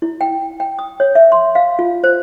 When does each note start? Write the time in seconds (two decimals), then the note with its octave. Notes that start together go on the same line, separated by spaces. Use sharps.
0.02 E4
0.21 G5
0.60 G5
0.79 D#6
1.00 C#5
1.15 E5
1.32 C6
1.55 F5
1.79 F4
2.04 C5